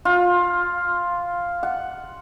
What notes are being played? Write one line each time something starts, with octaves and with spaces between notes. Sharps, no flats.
F4
F#5